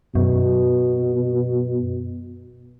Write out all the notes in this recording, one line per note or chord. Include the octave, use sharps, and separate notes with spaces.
F#2 B2